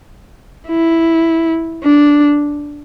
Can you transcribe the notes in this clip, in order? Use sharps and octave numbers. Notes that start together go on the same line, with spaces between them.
E4
D4